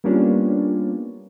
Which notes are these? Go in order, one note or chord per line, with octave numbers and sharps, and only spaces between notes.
G3 A#3 B3 C#4 D4 F4